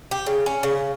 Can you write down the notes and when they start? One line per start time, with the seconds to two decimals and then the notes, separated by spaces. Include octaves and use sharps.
0.11 G4
0.26 C#3
0.46 C#4
0.63 C#3